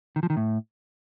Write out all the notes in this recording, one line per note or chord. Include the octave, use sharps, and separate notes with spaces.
D#3
F3
D#3
A2